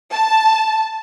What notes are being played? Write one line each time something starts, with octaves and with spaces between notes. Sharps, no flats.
A5